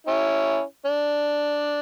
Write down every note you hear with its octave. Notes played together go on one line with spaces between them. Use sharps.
C#4 E4
D4